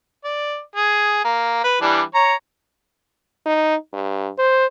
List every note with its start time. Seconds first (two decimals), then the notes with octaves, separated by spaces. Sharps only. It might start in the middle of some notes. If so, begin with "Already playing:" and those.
0.24 D5
0.76 G#4
1.25 A#3
1.64 B4
1.81 E3 G3 D4
2.15 C#5 A#5
3.46 D#4
3.93 G2
4.39 C5